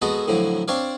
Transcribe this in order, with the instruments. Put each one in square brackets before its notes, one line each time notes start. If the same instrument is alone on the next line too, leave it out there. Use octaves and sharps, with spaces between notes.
[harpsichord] G#3 B3 F#4 A4
A2 D3 F3 F#3
C4 D4 C#5 D5 F5